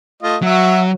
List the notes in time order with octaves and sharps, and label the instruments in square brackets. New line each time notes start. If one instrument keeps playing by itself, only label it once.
[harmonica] A3 F4 D#5
[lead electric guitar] F#3 [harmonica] F#4 E5